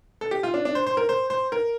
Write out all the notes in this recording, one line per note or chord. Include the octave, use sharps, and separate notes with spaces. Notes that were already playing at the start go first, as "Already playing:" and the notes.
A4
G4
F4
D4
D4
C5
C5
A#4
C5
C5
A#4